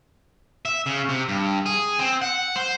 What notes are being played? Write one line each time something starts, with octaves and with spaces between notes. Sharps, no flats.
E5
C#3
C3
G2
G#4
C4
F#5
C5